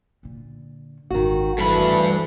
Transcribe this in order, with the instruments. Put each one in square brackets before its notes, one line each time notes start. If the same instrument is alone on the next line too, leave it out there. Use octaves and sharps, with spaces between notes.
[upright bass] A#2 D3
[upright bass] G#1 F#2 [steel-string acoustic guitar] D#3 F#4
[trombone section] D2 E3 [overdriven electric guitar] G2 B5 [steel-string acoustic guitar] A4